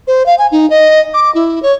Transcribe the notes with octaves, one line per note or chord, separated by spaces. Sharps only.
C5
F5
G#5
D#4
D#5
D6
E4
C#5